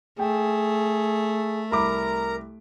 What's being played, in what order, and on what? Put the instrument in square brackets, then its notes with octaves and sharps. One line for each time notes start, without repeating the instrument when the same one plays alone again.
[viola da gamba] A3 [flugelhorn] G#4 [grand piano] G5
[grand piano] C2 B5 D6 [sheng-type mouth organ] A#4 A#5